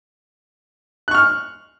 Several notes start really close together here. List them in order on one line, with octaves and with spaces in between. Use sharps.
F#6 C#6 F6